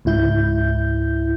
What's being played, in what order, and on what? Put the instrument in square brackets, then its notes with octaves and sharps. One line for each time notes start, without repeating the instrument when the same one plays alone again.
[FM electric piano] C#2 G#2 E4 G6